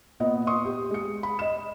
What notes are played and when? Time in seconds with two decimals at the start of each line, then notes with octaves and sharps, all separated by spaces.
0.20 A#2 B3 D#5
0.47 C6 C#6 D#6
0.65 G4
0.90 G#3 C#7
1.23 B5
1.39 D#5 E7